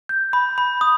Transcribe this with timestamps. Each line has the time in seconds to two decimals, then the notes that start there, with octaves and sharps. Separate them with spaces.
0.09 G6
0.33 B5
0.58 B5
0.81 D#6